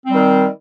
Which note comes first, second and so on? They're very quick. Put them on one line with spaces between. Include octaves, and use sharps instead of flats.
C4 G3 D#3